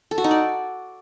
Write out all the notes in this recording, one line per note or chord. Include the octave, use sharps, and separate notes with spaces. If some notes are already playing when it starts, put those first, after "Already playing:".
A4
F#4
D#4
D5